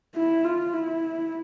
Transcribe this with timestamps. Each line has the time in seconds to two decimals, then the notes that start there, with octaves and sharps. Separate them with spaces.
0.16 E4
0.44 F4
0.73 E4